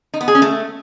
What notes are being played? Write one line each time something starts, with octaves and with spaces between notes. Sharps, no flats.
D#4
B3
G#4
C#4
A3